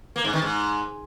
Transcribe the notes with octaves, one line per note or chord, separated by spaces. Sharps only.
A#3
G#2
D#3
G#2